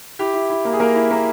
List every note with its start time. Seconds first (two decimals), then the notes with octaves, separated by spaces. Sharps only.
0.19 E4 G4
0.34 E4
0.50 E4
0.65 A#3
0.73 G#4
0.80 A#3 A#4
0.95 E4
1.11 A#3